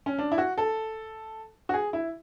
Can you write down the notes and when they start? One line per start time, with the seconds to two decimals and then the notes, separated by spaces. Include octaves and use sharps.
0.06 C#4
0.18 D4
0.32 E4
0.38 F#4
0.58 A4
1.69 F#4
1.74 G#4
1.93 E4